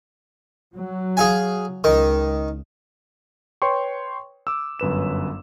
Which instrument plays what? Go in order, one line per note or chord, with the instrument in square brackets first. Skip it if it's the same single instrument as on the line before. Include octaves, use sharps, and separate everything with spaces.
[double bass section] F#3
[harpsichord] G#4 F5 G#5
[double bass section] C#2 [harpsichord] D#3
[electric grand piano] B4 C#5 G5 C6 C#6
D6 E6
G1 F#2 B4 E7